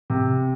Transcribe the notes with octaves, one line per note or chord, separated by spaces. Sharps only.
C3